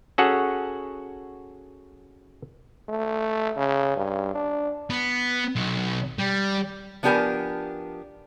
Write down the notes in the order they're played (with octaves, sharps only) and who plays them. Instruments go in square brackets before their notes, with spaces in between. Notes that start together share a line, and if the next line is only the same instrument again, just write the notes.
[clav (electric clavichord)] C#4 F#4 G#4 A4 F#5
[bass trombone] A3
C#3
G2
D4
[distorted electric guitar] B3
B1
G3
[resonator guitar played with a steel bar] F3 B3 D4 G4 A#4 G#5